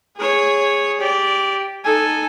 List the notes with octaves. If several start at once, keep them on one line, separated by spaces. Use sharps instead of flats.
G#4 C#5
G4 D5
D#4 A4 G#5